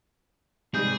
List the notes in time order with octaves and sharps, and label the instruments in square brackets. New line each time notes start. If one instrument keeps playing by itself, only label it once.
[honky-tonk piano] G#2 G3 [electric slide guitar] C3 G#3 [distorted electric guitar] G#4 [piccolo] G6